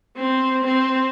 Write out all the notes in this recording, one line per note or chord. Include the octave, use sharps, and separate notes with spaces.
C4
C4